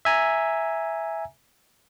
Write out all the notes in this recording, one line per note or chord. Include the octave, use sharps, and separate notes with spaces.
E5 G#5 A#5